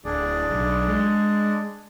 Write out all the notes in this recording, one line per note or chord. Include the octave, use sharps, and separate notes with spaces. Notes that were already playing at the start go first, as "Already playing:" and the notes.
D1 D4 G#4 D5
B1
G#3